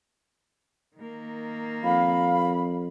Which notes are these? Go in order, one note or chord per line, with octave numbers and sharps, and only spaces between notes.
D#3 A#3
F2 F5 B5